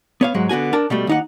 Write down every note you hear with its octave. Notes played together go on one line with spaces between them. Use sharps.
B3 C#5 F5
G#2 F#3 G#3
D3 B3 F#4 G#5
D4 A#4 A5
B2 G3 A3
D#2 D#4 F#5